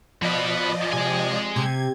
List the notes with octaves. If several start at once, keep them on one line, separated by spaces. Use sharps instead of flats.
B2 F3 B4 D5 D#5
C3 G#3 G#5
C3 G#6